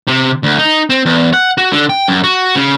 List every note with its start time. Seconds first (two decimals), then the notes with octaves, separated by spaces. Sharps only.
0.07 C3
0.43 D2
0.58 D#4
0.90 C4
1.06 E2
1.33 F#5
1.58 F#4
1.72 D3
1.89 G5
2.08 F#2
2.24 F#4
2.56 C#3